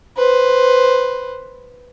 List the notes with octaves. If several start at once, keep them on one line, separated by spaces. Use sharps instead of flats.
B4 C5